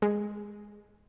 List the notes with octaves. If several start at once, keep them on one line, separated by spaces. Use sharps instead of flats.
G#3 G#4